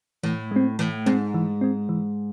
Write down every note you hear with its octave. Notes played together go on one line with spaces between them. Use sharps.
A2 E3
G#3 C4
A2 E3
G#2 G#3 C4
E3
G#3 C4
E3